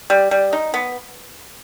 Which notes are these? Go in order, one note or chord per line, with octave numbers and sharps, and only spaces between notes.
G3
G3
D#4
B3